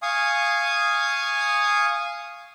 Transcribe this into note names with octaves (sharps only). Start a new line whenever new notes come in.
F5 G#5 C#6 D#6